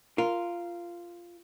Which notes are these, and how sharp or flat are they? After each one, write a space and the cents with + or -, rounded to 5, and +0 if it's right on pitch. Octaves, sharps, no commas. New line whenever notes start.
F4 -10 A#4 +0